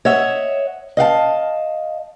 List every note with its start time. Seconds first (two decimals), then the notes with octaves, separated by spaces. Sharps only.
0.05 C#5 D#5 E5 F#5
0.97 D#5 F5 F#5 A5